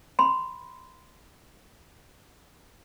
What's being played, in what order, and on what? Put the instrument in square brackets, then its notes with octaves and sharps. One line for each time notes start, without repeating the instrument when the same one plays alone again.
[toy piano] B5 C6